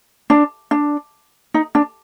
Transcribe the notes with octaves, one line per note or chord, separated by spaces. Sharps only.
D4
D4
D#4
D4